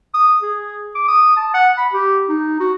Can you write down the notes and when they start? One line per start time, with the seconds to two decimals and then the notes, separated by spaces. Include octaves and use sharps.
0.14 D#6
0.42 G#4
0.95 D6
1.08 D#6
1.37 A5
1.54 F#5
1.78 B5
1.93 G4
2.29 D#4
2.60 F#4